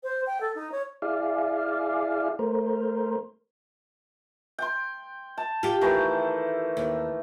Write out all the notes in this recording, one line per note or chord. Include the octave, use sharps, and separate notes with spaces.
C5
G5
A4
D#4
C#5
E4 G#4 D5 F5
A3 A#4 C5
G5 C6
A5
F4 G4
D#3 E3 A3
D#2